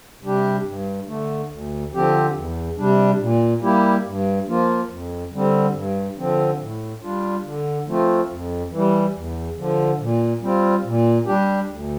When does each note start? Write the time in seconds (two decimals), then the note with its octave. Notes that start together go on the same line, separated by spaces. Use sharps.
0.23 C3 G3 D4 G4
0.66 G2
1.07 D3 A3
1.50 D2
1.93 D3 F3 C4 G4
2.35 E2
2.77 C3 G3 D4
3.20 A#2
3.62 G3 A#3 E4 G4
4.05 G2
4.48 F3 A#3 F4
4.90 F2
5.32 D3 G3 C4
5.74 G2
6.17 D3 F3 C4
6.60 A2
7.02 G3 D4 F4
7.44 D3
7.87 F3 A3 C4 F4
8.29 F2
8.71 E3 G3
9.15 E2
9.57 D3 F3
9.99 A#2
10.42 G3 C4 F4
10.84 A#2
11.26 G3 D4 G4
11.68 D2